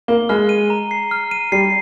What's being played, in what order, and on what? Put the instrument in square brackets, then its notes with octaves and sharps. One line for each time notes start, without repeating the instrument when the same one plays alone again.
[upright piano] A#3 [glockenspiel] G7
[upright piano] G#3 [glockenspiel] F6
[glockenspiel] D#7
A#5
C7
F6
D#7
[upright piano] G3 [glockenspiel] C7